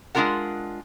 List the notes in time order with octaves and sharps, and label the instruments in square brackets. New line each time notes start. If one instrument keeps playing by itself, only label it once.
[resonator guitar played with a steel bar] G#3 C4 D4 F4 A#4 F#5